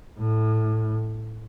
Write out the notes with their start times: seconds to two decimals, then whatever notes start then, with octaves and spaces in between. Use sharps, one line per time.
0.18 A2